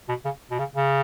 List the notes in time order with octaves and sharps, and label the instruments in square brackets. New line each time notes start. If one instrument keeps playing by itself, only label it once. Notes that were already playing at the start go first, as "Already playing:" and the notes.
[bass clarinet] B2
C#3
B2
C#3
C#3